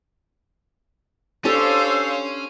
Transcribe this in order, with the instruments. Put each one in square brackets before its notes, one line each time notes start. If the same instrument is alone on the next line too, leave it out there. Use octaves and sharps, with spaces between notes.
[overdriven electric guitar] C#4 [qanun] D4 G4 A4 [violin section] C5 C#5 F5 [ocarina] E6